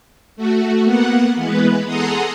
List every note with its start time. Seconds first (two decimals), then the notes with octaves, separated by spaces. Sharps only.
0.36 A3 F#4
0.84 A#3 B3 F#5
1.36 E3 G#3 B3 B4
1.86 G#4 A4 F#5 A#5 C6 D#6